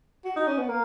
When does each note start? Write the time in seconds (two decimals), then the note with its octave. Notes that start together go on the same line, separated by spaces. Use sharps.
0.25 F#4
0.36 D#4
0.47 C#4
0.58 B3
0.69 A#3